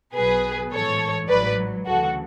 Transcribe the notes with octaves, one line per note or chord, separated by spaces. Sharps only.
B1 B2 F#3 G#4 B4
A1 G#2 E3 A4 C#5
A1 G#2 F#3 B4 D5
D2 C#3 E3 F#4 A4